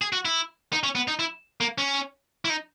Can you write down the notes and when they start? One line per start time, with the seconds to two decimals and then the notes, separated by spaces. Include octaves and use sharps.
0.02 G#4
0.13 F#4
0.25 E4
0.73 D#4
0.83 C#4
0.95 B3
1.08 D#4
1.19 E4
1.61 A#3
1.78 C#4
2.45 E4
2.50 D#4